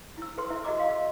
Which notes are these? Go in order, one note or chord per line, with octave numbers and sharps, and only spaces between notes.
E4 E6
A4 B4 C6
E4 E5 A#5
F#4 G#4 D#5 A#5 D6 E6
F5 C6